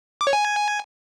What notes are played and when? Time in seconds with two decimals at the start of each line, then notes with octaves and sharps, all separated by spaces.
0.21 D6
0.27 C#5
0.33 G#5